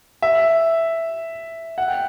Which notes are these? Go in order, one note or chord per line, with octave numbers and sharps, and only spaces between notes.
E5
F#5
G5